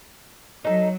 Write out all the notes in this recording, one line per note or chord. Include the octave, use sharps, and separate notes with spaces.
F#3 D#4 A4